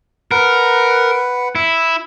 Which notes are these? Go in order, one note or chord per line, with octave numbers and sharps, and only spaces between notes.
A#4 B4 F#5
E4